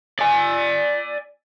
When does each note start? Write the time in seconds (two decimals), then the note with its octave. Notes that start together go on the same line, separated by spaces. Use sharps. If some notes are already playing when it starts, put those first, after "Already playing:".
0.19 D5 G#5